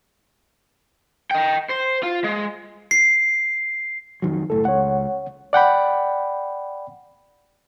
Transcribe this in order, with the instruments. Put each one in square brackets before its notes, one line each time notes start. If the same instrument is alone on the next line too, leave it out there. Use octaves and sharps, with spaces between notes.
[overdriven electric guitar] D#5 G5
C5
F4
G#3
[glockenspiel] C7
[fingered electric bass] F2 D#3 F#3
[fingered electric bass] F#1 A2 [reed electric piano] A4
[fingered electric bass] C#2 [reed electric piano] C#5 F#5
[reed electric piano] D5 F#5 G5 B5